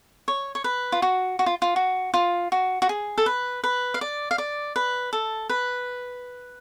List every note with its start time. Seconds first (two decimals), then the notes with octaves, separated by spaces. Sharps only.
0.28 C#5
0.55 C#5
0.64 B4
0.92 F4
1.02 F#4
1.39 F#4
1.46 F4
1.62 F4
1.76 F#4
2.14 F4
2.52 F#4
2.82 F#4
2.89 G#4
3.18 A4
3.26 B4
3.64 B4
3.94 F5
4.01 D5
4.31 F5
4.38 D5
4.76 B4
5.13 A4
5.49 B4